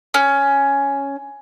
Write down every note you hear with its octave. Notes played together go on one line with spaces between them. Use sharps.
C#4